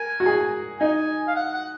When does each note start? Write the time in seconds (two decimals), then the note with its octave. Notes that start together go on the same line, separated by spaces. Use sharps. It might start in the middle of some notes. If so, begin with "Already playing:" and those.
Already playing: A#4 G#5
0.20 F#4
0.26 G#4
0.80 D#4 G#5
1.28 F5
1.35 F#5
1.54 F#5